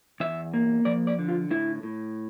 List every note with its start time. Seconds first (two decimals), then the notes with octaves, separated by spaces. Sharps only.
0.20 E2 E5
0.54 A#3
0.85 F3 D5
1.07 D5
1.19 D3
1.29 F4
1.51 A2 E4
1.83 A2